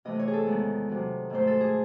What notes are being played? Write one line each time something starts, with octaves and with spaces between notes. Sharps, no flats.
C3 E3 A3 D#5
C#5
G#4
A4
E2 D#3 G#3
C3 D#3 F#3
G#2 D#3 A3 C5
A4
G#4